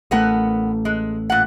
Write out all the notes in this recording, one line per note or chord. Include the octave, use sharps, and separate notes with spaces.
A1 A3 B3 A#4 F#5
G#3
A#2 F#5